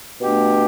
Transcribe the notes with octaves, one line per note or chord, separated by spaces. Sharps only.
B2 A3 D4 G4